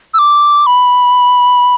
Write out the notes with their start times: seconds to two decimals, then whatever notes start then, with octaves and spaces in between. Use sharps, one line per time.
0.14 E6
0.19 D6
0.66 B5